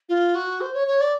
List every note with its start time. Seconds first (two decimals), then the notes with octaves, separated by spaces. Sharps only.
0.09 F4
0.35 F#4
0.61 C5
0.74 C#5
0.87 C#5
1.01 D5